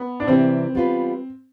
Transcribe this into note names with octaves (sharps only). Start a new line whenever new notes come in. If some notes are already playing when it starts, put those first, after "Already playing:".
Already playing: B3
D4
C3 E3 G3 C4
G3 B3 F4 B4